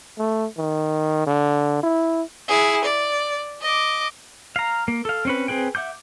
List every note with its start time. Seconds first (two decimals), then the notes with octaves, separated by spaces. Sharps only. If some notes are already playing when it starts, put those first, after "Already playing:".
0.18 A3
0.57 D#3
1.27 D3
1.83 E4
2.49 E4 G#4
2.85 D5
3.62 D#5 D6
4.56 F5 A#5
4.88 A#3
5.05 A4 F5
5.25 C4 C#4 B4
5.48 C4 G#4 B4 G5
5.75 E5 F#5 D6 G6